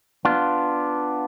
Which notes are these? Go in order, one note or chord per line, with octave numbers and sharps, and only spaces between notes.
B3 D4 F4